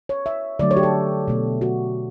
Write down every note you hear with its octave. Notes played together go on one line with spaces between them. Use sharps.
C#5
E5
D3 F#3 A3 D5
C#5
G4
A4
B2 A3
F#4